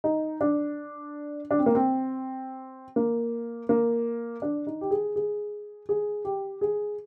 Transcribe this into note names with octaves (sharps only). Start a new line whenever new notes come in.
D#4
D4
D4
C4
A#3
C4
A#3
A#3
D4
D#4
G4
G#4
G#4
G#4
G4
G#4